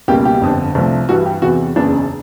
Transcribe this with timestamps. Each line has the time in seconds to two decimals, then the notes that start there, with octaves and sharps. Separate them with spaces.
0.08 C#2 B2 G3 A#3 G4
0.25 G4
0.41 G1 F2 D3
0.75 C2 C3 F3 A3
1.09 G2 E3 G3 F#4
1.26 G4
1.42 E2 C3 E3 F#4
1.76 F#1 E2 C#3 D4